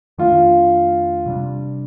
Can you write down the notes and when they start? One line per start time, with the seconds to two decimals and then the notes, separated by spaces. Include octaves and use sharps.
0.18 F2 D#3 A3 D4 F4
1.26 C3 G3 D4